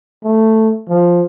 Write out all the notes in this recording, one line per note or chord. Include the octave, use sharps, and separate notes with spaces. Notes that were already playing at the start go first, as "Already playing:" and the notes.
A3
F3